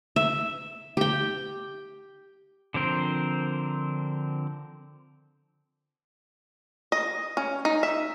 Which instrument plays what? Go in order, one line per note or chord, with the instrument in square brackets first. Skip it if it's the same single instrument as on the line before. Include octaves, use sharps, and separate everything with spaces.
[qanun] E5
G4 G5
[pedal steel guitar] D3 F3 C4 A#4 C5
[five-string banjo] D#5
C#4
D#4
E5